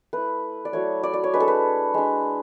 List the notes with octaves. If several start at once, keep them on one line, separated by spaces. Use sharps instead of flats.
A3 E4 B4
D5
F#3 A3 E4 C#5
D5
D5
C#5
G#3 D4 B4
A4
B4
G#3 D4